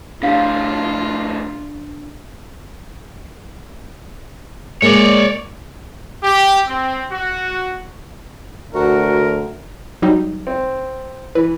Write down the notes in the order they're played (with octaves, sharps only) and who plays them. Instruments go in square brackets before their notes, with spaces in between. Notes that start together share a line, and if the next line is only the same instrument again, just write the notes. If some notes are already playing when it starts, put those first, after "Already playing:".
[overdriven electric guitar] A2 F3 [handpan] D4 [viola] F4 [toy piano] G4 F5
[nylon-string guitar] G#3 A#3 [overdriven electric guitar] C#5 D5
[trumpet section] G4
C4
F#4
[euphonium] D2 [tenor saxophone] F#4 [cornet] A#4
[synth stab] F#3 G3 D#4
[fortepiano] C4
[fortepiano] E3 [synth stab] B4